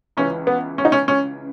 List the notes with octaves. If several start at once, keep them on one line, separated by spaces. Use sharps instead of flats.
C#2 C#3 E3 C#4
B3
C#4
D#4
C#4
C#4